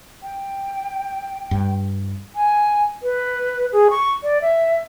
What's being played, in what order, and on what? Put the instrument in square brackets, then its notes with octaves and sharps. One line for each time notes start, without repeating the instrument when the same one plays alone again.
[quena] G5
[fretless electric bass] G2
[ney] G#5
B4
G#4
C#6
D5
E5